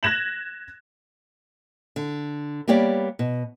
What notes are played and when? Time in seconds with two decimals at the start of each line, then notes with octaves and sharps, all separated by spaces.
0.03 F#6 G#6 A#6 E7 F#7
1.96 D3
2.68 G3 A#3 B3 G4 C#5 D5
3.19 B2